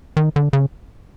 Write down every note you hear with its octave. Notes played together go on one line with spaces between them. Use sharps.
D#3
D3
C#3